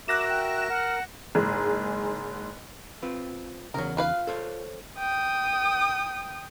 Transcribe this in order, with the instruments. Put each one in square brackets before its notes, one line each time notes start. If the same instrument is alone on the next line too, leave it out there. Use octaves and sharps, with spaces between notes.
[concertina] F#4 A#4 E5 [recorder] D6 [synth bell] F#6 A#6 E7
[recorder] G5
[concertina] A#4 [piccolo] F#5 [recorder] F6
[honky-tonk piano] F#1 G#2 G#4
[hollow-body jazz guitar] C4 F4 B4
[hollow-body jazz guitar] E2 G#2 C#3 [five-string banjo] F#3 A#4
[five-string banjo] F4 B4 F5
[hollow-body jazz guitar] A4 C5 C#5
[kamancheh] G5 D#6